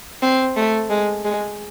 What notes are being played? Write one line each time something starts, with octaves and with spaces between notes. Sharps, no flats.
C4
A3
G#3
G#3